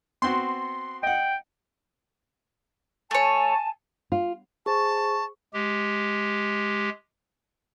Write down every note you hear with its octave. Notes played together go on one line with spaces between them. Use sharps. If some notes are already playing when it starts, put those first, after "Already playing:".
B3 C4 F#4 C6
D#5 F#5 G5
A3 C#5 G#5 A5
F4
G#4 C5 A5 C#6
G#3 G4